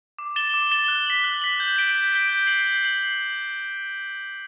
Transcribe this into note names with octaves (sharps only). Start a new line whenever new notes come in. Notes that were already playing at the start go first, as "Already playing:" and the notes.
D6
A6 E7 G7
D6
A6 E7 G7
F#6
B6 F#7
F#6
B6 F#7
G6
B6 D7 G7
G6
B6 D7 G7
G6
C7 F#7
G6
C7 F#7